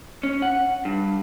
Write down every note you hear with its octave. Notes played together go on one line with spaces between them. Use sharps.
C#4
F#5
G2